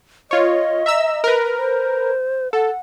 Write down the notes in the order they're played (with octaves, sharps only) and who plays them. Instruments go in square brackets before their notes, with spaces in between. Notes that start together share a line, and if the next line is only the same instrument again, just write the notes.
[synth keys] F4 C#5 [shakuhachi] D#5
[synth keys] E5 A#5 E6
A#4 B4
[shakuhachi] C5
[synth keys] A4 [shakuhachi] F#5